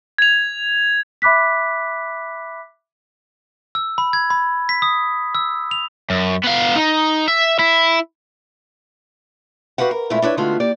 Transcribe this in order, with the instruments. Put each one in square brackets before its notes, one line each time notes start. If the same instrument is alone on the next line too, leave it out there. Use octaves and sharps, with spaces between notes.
[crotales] G#6 F7
[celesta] E5 B5 D6 F#6 B6
[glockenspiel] E6
B5
G#6
B5
B6
D#6
E6
F7
[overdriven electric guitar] F#2
B3 F5
D#4
E5
E4
[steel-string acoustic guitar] F#4 G4 B4 F5 F#5
A#4
A#2 G#3 A3 C4 E4 F4
D4 E4 B4 C#5
D3 G#3 A3 B3 F4 F#4
A#3 G4 D5